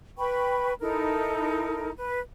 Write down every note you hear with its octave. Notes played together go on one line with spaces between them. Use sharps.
B4 G5 B5 C#6
D#4 E4 A4 A#4
B4